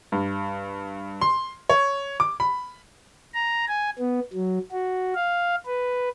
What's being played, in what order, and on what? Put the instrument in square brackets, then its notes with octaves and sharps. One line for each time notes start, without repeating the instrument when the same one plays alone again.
[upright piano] G2
C6
C#5
D6
B5
[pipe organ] A#5
G#5
B3
F#3
F#4
F5
B4